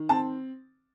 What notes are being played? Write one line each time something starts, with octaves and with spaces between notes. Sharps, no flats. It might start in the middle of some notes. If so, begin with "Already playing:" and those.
Already playing: D#3
C4 A5